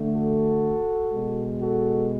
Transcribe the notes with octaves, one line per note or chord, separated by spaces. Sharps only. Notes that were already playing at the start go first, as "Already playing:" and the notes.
Already playing: D3 A3
F#4 A4
B2 G#3
F#4 A4